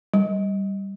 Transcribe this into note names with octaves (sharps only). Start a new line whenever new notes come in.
G3